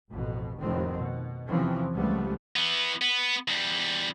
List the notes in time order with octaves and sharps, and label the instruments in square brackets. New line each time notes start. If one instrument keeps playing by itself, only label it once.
[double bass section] A1 F2 B2
F1 A2 D#3 F3 C4
B2
E2 C3 E3 F3 C4 C#4
C#2 E3 F3 G3 A3 B3
[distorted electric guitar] E3 B3
B3
E2 G3